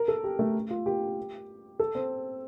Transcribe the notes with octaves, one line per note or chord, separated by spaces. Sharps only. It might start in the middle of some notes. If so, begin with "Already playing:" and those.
Already playing: A#4
A4
G4
A3
F4
G4
A4
C4